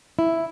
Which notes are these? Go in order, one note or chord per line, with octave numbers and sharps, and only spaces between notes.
E4